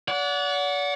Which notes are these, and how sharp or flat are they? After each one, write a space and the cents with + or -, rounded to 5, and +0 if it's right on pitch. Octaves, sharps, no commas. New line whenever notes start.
D5 -40 F#5 -15